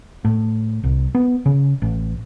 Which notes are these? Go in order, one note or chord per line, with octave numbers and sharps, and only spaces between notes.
A2
C2
B3
C#3
A1